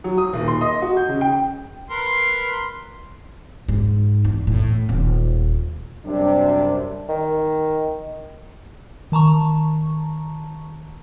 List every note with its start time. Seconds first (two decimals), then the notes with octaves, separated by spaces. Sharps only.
0.04 F#3
0.18 D#6
0.33 D#1
0.48 C6
0.61 D#5
0.82 F#4
0.97 G6
1.08 C#3
1.21 G5
1.90 A#4 B4 C6
3.69 G#2
4.25 E2
4.47 A2
4.89 D#1
6.06 F#2 C3 G3 D4
7.09 D#3
9.12 D#3 A5 A#5 C#6